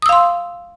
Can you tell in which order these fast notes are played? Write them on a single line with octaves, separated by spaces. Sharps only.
D#6 E6 F5 C6